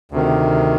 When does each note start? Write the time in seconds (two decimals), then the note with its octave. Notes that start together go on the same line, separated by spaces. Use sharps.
0.12 D2 C3 D#3